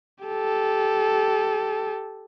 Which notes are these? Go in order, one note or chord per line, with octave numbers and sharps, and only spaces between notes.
G4 A4